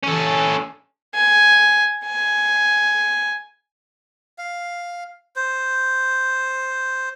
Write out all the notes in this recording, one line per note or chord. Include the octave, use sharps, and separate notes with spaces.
C#4 A4
G#5
G#5
F5
C5